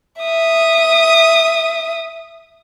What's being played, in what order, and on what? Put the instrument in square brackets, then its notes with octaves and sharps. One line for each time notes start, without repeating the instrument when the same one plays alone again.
[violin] E5 D#6